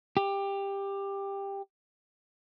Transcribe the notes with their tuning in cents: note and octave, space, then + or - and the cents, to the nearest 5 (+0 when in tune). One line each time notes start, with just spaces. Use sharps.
G4 +15